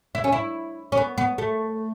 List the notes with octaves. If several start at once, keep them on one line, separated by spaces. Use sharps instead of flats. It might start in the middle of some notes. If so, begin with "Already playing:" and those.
E4
C#4
E4
C#4
B3
B3
A3